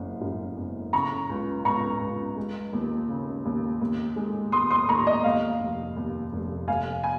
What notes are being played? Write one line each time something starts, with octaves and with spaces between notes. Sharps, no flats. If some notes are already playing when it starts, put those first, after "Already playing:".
Already playing: F#1 F#2
F#2
F#1
C#3 A#5 C#6
C#2
C#2 A#5 C#6
C#2
G#3
D#2
C#3
D#2
D#2
G#3
D#2 C6 D#6
C6 D#6
D#2 A#5 C#6
D#5
D#2 F5
F1
D#2
F1
F1 F5 G#5
G#5